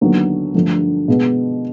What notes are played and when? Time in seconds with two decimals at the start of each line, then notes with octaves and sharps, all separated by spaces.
0.01 D#2 D3 F#3 B3
0.54 G2 D3 F3 A3
1.08 B2 G#3 B3